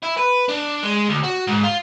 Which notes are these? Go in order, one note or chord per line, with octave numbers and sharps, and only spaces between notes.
E4
B4
D4
G#3
D2
F#4
G#2
F4